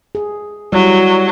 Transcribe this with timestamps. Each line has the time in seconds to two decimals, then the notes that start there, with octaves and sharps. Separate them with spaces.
0.15 G#4
0.73 F#3 G3 E4